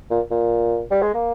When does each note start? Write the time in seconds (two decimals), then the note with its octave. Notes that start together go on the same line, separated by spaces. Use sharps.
0.10 A#2
0.31 A#2
0.91 G3
1.02 G#3
1.14 A#3